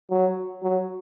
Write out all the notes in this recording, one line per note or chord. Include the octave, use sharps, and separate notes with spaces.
F#3
F#3